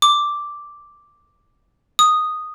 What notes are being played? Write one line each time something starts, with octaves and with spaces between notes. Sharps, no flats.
D6
D#6